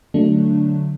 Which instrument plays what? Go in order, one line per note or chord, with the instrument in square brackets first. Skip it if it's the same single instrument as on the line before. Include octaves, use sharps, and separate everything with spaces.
[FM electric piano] D3 F#3 A3 D4